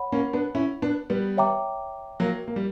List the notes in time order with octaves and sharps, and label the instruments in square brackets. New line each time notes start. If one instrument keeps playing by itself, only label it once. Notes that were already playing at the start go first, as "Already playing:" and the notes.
Already playing: [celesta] C#5 F#5 B5
[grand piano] A#3 C#4
B3 D4
C#4 E4
B3 D4
G3 B3
[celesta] C#5 E5 G5 A#5 D6
[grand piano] F#3 A#3
A#3
G3